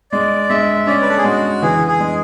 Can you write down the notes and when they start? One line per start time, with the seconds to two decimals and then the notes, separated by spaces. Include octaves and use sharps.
0.12 G#3 D5
0.49 G#3 E5
0.87 C#4 D5
1.02 B4
1.09 A4
1.17 G#4
1.24 G#3 F#4
1.62 E3 G#4
1.87 G#4
2.00 G#3